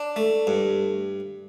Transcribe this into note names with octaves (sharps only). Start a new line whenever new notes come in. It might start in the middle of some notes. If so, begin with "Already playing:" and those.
Already playing: D4
A3
G2